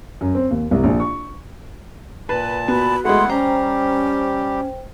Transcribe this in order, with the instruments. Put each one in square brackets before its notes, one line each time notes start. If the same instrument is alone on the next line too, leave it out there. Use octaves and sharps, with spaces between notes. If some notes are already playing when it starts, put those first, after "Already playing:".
[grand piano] F#2
C4
D#2
C2
A#1
C#6
[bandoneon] A#2 A5 [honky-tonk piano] B4
[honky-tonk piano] B3 [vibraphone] F#4 [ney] B5
[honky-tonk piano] G#3 A3 [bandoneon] B3 E4 F#5 [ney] C6
[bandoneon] G3 G4 [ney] C#4 [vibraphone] C5 G5 [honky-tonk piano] A#5